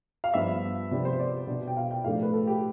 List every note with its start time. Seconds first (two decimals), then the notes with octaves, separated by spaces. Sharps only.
0.24 F5
0.34 G2 F3 B3 D4 E5
0.91 C3 F3 B3 D4
1.05 C5
1.19 D5
1.48 B2 B3 D4
1.68 G5
1.77 F5
1.91 G5
2.04 A2 F3 A3 D4 F5
2.22 B4
2.34 A4
2.47 G4